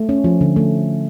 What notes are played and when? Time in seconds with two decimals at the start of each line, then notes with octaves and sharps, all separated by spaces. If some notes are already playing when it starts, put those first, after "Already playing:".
Already playing: A3
0.09 C#4
0.24 F3
0.41 D3
0.56 A3